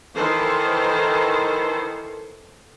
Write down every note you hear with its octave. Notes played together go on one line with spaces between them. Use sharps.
D#3 E3 A4 C5